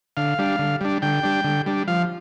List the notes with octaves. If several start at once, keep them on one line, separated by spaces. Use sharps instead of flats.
D3 F5
G3 D4
D3
G3 D4
D3 G5
G3 D4
D3
G3 D4
F3 F5